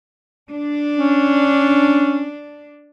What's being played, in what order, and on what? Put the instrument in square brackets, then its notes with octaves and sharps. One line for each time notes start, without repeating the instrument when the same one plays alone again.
[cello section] D4
[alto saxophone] C#4